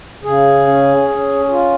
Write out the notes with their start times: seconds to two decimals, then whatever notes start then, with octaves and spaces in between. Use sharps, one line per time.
0.24 C#3 G#4
0.67 C#4
1.09 C#4
1.50 F4